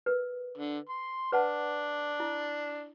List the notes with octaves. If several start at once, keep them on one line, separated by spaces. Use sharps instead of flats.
A#4 B4
D3
C6
D4 B4 F#5 A5
E4